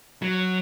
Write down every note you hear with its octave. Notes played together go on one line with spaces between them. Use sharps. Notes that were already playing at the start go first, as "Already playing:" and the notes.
F#3